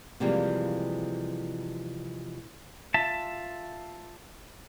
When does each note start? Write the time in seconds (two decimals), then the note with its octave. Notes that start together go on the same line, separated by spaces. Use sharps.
0.20 C3 E3 F3 G3 G#3 A#3
2.94 F4 E5 A5